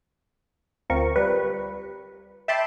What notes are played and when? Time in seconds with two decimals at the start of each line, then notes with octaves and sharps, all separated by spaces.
0.90 D2 C4 F4 A#4 C#6
1.16 G3 B4
2.48 E5 G5 A5 B5 C6 D6